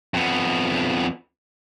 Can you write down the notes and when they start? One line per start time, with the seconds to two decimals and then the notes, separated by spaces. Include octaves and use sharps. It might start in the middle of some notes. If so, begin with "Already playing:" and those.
0.14 F2 B3